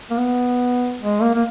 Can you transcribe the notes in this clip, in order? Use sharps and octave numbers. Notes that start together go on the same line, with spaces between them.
A#3
B3
G#3
A#3
A#3